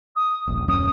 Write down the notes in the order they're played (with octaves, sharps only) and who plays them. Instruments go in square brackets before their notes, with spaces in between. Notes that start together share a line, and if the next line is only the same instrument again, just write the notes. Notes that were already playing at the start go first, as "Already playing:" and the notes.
[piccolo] D#6
[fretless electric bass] D#1 A#1
[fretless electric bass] D#1 F#2 C#4 [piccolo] D#6